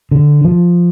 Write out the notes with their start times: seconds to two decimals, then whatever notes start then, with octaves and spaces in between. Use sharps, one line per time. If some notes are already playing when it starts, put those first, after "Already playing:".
0.11 D3
0.44 F3